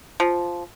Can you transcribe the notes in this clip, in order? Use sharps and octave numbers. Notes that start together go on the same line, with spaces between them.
F3